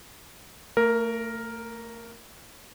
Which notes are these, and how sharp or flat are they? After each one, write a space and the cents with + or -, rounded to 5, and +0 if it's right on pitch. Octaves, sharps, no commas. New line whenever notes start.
A3 +40 A#4 +0